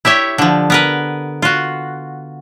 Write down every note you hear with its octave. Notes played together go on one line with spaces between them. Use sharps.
E4 G4 C#5 E5
D3 F3
B3 A#4 B4
F4 F#4